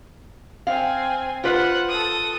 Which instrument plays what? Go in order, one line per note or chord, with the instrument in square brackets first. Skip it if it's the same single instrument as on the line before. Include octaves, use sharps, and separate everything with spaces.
[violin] C4 G#5 [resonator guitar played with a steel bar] F5
[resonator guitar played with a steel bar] F4 B4 [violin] C5 F#5
[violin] A4 D#6